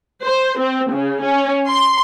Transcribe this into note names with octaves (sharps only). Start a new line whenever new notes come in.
C5
C4
C#3
C#4
C6